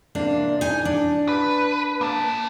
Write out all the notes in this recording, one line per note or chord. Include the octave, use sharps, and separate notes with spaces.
C3 A#3 D4
D#4 G#5
D4
B4
A#3 A5